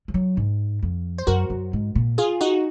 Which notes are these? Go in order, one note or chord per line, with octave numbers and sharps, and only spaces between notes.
F3
F#3
G#2
F2
C5
F#2 F#4 A#4
F#2
G#2
A#2
F4 G#4
D#4 F#4